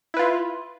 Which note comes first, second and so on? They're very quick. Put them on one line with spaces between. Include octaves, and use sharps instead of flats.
E4 B4 F4